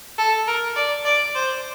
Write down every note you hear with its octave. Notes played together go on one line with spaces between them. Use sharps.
A4
A#4
D5
D5
C5